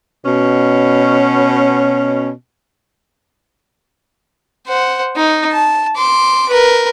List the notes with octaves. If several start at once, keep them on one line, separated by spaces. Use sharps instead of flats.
B2 C#4
C5 F#5
D#4
A5
C6 D6
A#4 B4